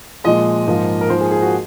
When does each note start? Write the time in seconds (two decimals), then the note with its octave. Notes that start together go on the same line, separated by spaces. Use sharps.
0.24 A#2 F3 G#3 D#5
0.67 G#2 F3 A#3
1.01 A#4
1.10 G#2 F3 A#3 C5
1.21 G#4
1.31 G#4
1.42 F#4